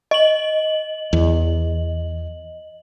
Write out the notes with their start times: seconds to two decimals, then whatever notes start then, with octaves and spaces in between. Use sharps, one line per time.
0.11 D#5 F#7
1.13 E2